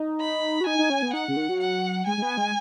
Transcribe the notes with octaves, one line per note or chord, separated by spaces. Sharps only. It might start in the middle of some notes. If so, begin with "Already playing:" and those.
Already playing: D#4
B5
F#4
D#4 G#5
D#4
C#4
B3
D#4 F#5
C#3
D#3
F#3
F#5
G#3 G#5
G#3
B3
G#3